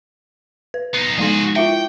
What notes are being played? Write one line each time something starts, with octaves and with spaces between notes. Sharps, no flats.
B4
B3 D#4 C7
F3 G#3 D#4 F#4 G#4
E4 F4 E5 G5